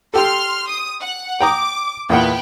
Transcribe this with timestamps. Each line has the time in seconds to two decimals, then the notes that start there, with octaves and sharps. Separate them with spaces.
0.14 G4 A4 C6 F6
0.68 D#6
1.01 F#5
1.41 G5 A#5 D6 D#6
2.10 E2 A#2 B3 F#5 G5